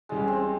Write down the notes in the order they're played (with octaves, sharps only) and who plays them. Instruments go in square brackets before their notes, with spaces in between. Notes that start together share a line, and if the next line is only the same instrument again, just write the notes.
[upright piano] C#2 C#3 E3 G3 [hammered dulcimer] G#3
[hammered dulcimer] C4